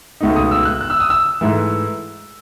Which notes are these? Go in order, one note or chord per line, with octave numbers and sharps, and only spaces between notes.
C#2 B2 A3 D#4
D#6
E6
F#6
F#6
E6
D#6
E6
G#2 E3 A3